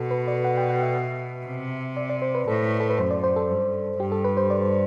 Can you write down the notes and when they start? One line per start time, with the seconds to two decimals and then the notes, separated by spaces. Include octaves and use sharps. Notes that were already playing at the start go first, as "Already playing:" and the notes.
Already playing: B2 A4
0.11 B4
0.28 D5
0.45 F#5
0.57 G5
0.70 F#5
0.83 E5
1.46 C3
1.97 D5
2.10 D5
2.22 C5
2.35 B4
2.47 A2 A4
2.80 A4
2.90 B4
2.98 F#2 C5
3.11 D5
3.24 C5
3.36 A4
3.49 G2
4.00 G2 G4
4.12 A4
4.24 B4
4.37 C5
4.50 D5